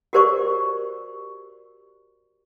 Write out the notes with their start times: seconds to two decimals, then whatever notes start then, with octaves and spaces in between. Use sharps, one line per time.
0.13 F#4 G4 A#4 C5 D5 C#6